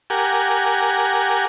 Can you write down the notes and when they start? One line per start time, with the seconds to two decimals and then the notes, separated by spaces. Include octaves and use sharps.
0.10 G4 A#4 F#5 G#5